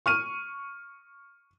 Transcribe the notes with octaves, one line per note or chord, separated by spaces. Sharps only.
C#6 F6 D#7